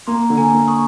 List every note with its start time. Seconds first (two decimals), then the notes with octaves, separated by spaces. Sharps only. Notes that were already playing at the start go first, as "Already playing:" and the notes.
0.07 A#3 A#5 C6
0.30 D3
0.37 G#5 A#5
0.53 A#3
0.67 C#6 D#6